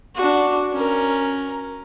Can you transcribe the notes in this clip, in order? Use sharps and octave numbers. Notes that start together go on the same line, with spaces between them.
D4 F#4
C#4 A#4